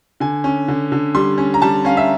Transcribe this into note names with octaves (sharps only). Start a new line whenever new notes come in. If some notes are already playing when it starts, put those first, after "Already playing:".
D3 G#5
C#4
D3
D3
G3 C6
C#4
A#5
G3 A5
C#4 F5
E5